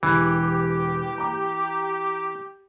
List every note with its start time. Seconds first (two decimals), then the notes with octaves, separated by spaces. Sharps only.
0.03 E1 E3 G4
1.18 A#5 D6